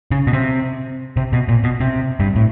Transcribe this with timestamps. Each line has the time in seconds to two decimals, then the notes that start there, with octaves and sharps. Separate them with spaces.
0.11 C#3
0.27 B2
0.33 C3
1.17 C3
1.33 B2
1.48 A#2
1.64 B2
1.80 C3
2.20 G2
2.36 A2